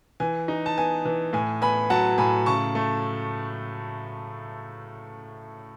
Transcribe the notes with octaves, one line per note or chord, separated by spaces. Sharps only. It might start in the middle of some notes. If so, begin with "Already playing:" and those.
E3 G#5
D#4
A5
B3 G#5
E3
A2 G#5
B3 G#5 B5
F#3 F#5 A5
A2 G#5 B5
C#3 A5 C#6
A3